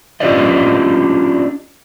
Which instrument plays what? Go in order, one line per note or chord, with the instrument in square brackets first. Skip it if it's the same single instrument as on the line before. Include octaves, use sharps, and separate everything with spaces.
[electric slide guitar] C#4 D4 F4 G4 D5 D#5